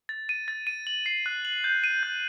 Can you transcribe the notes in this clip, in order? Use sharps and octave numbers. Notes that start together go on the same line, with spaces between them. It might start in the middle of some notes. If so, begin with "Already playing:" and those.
A6
D#7
A6
D#7
F#7
C7
F#6
F#7
G6
D#7
G6